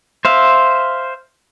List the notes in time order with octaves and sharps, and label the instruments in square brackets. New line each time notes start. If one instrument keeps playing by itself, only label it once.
[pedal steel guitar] C5 E5 F5